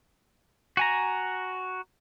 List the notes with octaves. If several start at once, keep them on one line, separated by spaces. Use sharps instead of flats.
F#4 G#5 A#5